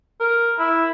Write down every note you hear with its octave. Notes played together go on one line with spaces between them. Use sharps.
A#4
E4